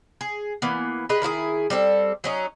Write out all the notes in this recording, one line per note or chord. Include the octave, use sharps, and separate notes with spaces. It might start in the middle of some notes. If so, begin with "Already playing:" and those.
G#4
E3 A#3 B3
G4 G#4 B4 D#5
D#3 E4 F#4 G#4
G3 C4 D4 A4
F#3 C#4 D#4